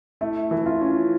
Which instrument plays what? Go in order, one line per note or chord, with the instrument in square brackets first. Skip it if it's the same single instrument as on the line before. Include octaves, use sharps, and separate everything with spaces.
[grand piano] A3 [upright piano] E4
[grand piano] E3
[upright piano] F4
[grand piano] C#4